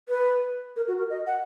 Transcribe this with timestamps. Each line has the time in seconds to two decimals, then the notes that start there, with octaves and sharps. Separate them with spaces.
0.09 B4
0.76 A#4
0.88 F#4
0.98 A#4
1.10 D#5
1.27 F#5